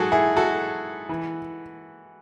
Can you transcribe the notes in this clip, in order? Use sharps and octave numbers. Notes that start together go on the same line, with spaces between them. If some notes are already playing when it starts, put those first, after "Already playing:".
Already playing: G#2 F#3 F#4 G#4 A4
E4 G#4
F#4 A4
E3